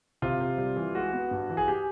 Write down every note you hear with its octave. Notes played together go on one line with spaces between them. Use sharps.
C3 F4
C3
G3
E3
G#3 F#4
B3
G2
E3
G#4
G4